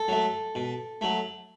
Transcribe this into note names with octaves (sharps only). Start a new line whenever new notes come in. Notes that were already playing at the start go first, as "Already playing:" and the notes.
Already playing: A4
F#3 A3
B2
F#3 A3